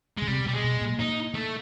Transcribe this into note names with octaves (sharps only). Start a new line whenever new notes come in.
C#3 G#3
C3 G3
B2 G3
G#3
B2
A#2
D#4
A3